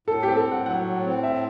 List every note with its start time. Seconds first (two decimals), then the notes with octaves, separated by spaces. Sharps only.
0.07 A2 A4
0.23 C4 G4
0.37 A4
0.46 A2
0.51 F#5
0.66 F#3 F#5
0.85 A2
1.04 C4
1.23 A2 E5